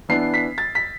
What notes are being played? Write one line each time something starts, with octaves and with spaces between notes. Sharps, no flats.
E3 B3 D4 C7
B6
A6
B6